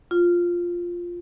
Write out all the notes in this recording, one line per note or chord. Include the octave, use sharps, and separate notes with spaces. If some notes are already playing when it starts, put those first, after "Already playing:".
F4